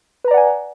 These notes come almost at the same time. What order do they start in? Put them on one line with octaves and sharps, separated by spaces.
B4 A#5 D5 F#5 G#5